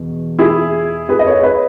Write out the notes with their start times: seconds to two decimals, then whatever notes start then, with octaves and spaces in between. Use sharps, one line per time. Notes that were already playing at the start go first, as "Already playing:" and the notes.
Already playing: E2 B2
0.39 E4 G#4
1.09 G#4 B4
1.19 D#5
1.26 A4 C#5
1.40 C#5
1.43 B4 D#5